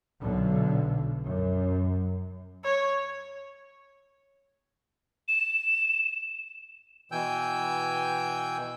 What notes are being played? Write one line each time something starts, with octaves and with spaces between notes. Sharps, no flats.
B1 B2 D3
F#2
C#5
E7
B2 E3 G5 G#5 E6 G6